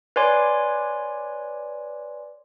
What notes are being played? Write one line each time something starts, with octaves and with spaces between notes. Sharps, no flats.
B4 C#5 D5 G#5 C6 D6